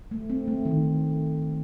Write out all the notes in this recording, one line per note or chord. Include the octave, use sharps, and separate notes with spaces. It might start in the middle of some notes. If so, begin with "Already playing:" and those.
A3
C4
A3
D#3